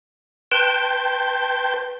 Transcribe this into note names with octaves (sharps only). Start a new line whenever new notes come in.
B4 G5 A5 C6 G6